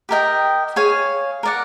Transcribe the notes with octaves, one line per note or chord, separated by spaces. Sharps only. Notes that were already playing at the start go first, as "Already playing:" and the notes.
G4 A#4 D#5 G5
G#4 C#5 F5 G#5
A#4 D5 F#5